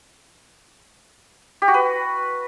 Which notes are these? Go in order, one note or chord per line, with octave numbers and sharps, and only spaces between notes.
G4
F#4
B4